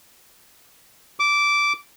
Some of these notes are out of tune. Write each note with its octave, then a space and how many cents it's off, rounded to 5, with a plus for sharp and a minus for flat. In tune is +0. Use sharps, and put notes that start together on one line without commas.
D6 -10